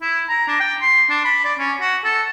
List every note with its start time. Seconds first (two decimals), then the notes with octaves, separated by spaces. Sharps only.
0.02 E4
0.29 A#5
0.48 D4
0.60 G5
0.81 C6
1.10 D4
1.24 B5
1.45 D5
1.59 C#4
1.80 F#4
2.04 A4